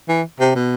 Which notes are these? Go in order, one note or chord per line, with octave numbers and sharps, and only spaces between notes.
E3
C3
B2